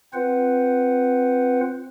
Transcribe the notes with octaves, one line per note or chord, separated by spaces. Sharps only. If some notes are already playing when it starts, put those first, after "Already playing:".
C4 F4 B4 C5 F#5